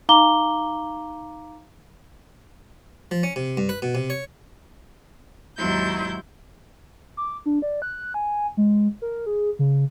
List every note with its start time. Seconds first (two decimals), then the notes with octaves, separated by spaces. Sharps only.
0.09 D#4 F5 A#5 D6 G7
3.11 F3
3.23 C#4
3.36 C3
3.57 G2
3.69 B4
3.82 B2
3.95 C3
4.10 C#5
5.57 D#2 G#2 F#3 E4 C6 G6
7.17 D6
7.46 D4
7.62 D5
7.82 F#6
8.14 G#5
8.57 G#3
9.02 A#4
9.26 G#4
9.59 C#3